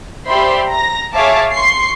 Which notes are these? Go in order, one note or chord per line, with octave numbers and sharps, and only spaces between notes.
G4 C5 D5 E5 B5 C6
A#5 A#6
G#4 C#5 E5 F5 A5 D6
C6 C#6 C7